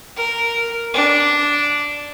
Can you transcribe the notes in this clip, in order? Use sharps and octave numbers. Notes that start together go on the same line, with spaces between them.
A#4
D4